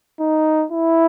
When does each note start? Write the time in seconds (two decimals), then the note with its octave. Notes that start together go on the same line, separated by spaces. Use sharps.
0.20 D#4
0.72 E4